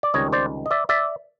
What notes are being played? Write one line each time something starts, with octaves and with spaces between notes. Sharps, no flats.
D5
C#2 C3 D#3 G3 C#5 D#5
C5 D5
D#5
D5 E5
D5 E5